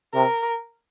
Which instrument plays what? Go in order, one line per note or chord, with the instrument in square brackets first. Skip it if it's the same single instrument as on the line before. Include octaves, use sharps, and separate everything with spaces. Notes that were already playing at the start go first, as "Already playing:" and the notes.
[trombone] C3 [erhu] A#4